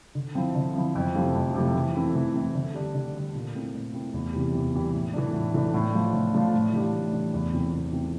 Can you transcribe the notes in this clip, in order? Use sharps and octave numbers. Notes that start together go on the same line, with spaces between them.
D3
F3 C4 E4
D3
F3 C4 E4
F2
C3 F3 A3 E4
F2
C3 F3 A3 E4
E3
A3 C4 E4
E3
A3 C4 E4
D3
G3 D4
D3
G3 D4
A#2
A3 C4 E4
A#2
A3 C4 E4
E2
C3 E3 G3
E2
C3 E3 G3
A2
E3 A3 D4
A2
E3 A3 D4
A2
F3 A3 D4 F4
A2
F3 A3 D4 F4
A2
E3 G3 D4
A2
E3 G3 D4
E2
E3 A3 C4
E2
E3 A3 C4